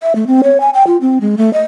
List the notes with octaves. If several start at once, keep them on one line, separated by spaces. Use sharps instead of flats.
E5
A3
C4
C#5
G#5
G5
F4
C4
G#3
A3
D#5